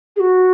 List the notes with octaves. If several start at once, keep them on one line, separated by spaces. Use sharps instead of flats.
G#4
F#4